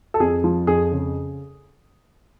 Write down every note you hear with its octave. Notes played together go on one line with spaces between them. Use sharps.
A4
F2 G#4
F3
F2 G#4
C#3